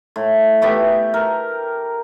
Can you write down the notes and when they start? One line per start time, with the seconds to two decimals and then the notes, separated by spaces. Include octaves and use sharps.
0.16 A2
0.62 A3 B3 G4
1.14 A#4